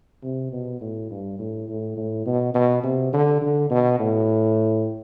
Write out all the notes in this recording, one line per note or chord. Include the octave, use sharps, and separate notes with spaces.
C3
B2
A2
G2
A2
A2
A2
B2
B2
C3
D3
D3
B2
A2